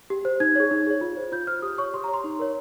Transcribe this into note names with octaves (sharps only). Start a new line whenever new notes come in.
G4
C5
D#4 G#6
G#4 C#5
D#4
G#4 C#5
F4
C5
F4 G6
C5 F6
G4 D#6
C#5 C#6
G4 C6
A#5
C#5 C6
D#4
A#4 C#5